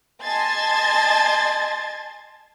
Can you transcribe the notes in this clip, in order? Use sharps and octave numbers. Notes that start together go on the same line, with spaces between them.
D#5 G#5 A5 C6 G#6 A6